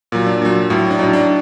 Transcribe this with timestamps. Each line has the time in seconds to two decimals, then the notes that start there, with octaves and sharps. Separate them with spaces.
0.12 A#2 F#3
0.26 D4
0.42 A#2 F#3
0.70 A2 F#3
0.90 D4
0.99 A2 F#3 D#4
1.13 D4